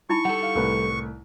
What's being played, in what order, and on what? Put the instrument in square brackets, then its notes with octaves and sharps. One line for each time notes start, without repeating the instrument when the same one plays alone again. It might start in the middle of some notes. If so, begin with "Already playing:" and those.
[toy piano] D#4 E4 B5 [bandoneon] C#6
[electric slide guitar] G3 A4 [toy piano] F#5
[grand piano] F5
C2 A2 B4